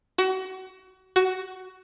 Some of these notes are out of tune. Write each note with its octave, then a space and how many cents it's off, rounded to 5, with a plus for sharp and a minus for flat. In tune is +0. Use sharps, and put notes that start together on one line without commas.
F#4 +30
F#4 +15